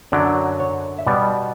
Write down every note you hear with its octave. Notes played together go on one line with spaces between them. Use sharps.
F#2 D3 F#3 D5
C#5
E5
B2 G3 B3 D5